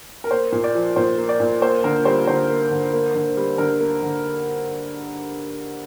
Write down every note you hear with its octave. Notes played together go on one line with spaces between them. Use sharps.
A#4
A#3 C5
A#2
D5
F3
A#2 C5
A#3
D5
A#2
A#3 C5
D3 A#4
G3 C5
D3 C5
A#3
D3
A#3
D3
G3
D3 A#4
A#3
D3